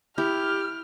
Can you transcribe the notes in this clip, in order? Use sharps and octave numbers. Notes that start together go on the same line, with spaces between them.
E4 G4 F6